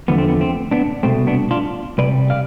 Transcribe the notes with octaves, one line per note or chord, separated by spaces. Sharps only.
E2 D3 F3 A3 B3
C4
B3
C4
B3 D4
C2 B2 A3 C4
B3 D4
D4 F4
C2 C3 G3 B4 D5
D5 F5